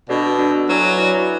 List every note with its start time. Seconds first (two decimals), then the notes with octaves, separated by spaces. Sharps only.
0.09 B2 D4 F#4 A4 D5
0.39 D4 F#4 A4 D5
0.69 F#3 E4 B4 D5 G#5
0.98 E4 B4 D5 G#5